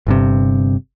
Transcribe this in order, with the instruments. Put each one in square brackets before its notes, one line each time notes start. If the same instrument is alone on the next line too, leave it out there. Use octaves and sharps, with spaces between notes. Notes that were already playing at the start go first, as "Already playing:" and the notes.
[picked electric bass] G1 G2 C3